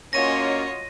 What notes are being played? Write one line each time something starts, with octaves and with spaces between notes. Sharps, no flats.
A#3 C#4 F4 F#4 C#5 D#5 A#6 D#7